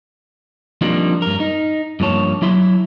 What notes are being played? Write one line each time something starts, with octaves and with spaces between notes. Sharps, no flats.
F3 G3 A#3 C4 D4 D#4
G2 A#4
D#4
G2 F3 A#3 C#5 A5
F#3 E4 E5 C6